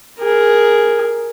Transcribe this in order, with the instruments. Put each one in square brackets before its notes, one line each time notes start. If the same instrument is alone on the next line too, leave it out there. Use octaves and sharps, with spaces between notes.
[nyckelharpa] G#4 A#4